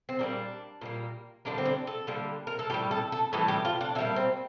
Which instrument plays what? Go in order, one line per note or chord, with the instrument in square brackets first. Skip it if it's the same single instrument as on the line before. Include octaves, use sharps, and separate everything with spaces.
[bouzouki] C4
A#2 G3 A#3 D4
A#2 G3 A#3
D3 G3 A#3 D4
C4
D4
A4
D3 G3 A#3
A#4
A4
A2 E3 G3 G4
A4
A4
A2 E3 G3 A4
G4
F4
D4
D3 E4
G3 A#3
C4